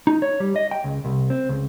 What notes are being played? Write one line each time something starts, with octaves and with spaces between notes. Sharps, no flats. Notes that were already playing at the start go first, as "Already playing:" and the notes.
D#4
C#5
G3
D#5
G5
C#2
C2
C4
C#2